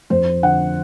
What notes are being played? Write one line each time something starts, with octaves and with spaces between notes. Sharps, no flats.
F2 C5
D3 F#5